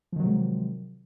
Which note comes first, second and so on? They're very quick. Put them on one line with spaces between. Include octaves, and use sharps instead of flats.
F3 D#3 F#3 C3 G#3